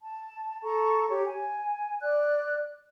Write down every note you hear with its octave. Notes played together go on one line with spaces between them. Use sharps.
A5
A4 A#5 C#6
G4 C#5
G#5
D5 F#6